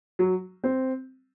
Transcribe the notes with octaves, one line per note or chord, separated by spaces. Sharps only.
F#3
C4